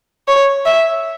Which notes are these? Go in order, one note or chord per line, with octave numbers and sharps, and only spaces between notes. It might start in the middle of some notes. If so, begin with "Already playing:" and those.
C#5
E5